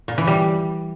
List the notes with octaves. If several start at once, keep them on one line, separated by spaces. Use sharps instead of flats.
A#2
E3
G3